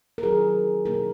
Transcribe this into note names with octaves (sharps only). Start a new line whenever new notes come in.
A#4
D#3 F#3 C#4 E4 G#4
B2 A#3 D#4 A#4